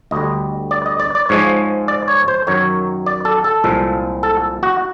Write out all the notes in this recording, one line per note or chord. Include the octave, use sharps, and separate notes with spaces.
D2 D3 G3 D#5
D5
D#5
D5
D5
G#2 F3 G#3 C#5
D5
C#5
C5
F#2 D#3 F#3 C#5
D5
A4
A4
C2 A#2 F3 G#3
A4
F#4